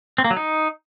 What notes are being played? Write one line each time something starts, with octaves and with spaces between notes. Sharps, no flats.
C4
A#3
F#3
D#4